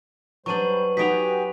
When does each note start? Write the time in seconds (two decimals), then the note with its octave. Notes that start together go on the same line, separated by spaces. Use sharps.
0.46 F#3 G3 D4 B4 C5 C#6 D#7 F#7
0.97 B3 D#4 F#4 G4 G#5 B6 D7 F7